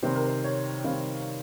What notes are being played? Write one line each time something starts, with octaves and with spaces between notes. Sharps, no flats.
C3 D#3 G3 C4 C5
A#4
C5
C#5
C3 D#3 G3 C4 F5